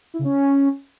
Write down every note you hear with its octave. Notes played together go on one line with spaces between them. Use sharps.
E4
C#3
C#4